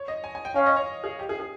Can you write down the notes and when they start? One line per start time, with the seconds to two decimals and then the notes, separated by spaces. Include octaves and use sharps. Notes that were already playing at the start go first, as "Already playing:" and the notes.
Already playing: C#5
0.08 D#5
0.24 G#5
0.35 G#5
0.45 G5
0.55 C#4 F5
0.66 D#5
0.77 C#5
1.04 G#4
1.19 G4
1.29 G#4
1.40 G#4